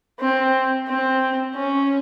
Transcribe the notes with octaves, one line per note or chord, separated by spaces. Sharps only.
C4
C4
C#4